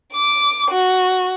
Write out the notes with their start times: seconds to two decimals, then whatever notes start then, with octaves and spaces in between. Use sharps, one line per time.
0.14 D6
0.71 F#4